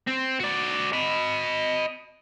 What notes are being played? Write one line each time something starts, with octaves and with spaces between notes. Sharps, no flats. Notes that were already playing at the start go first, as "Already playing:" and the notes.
C4
F#4 D5
D#5 B5